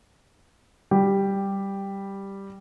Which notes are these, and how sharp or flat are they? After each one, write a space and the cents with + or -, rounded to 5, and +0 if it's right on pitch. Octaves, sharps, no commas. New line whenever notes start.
G3 +0 G4 +5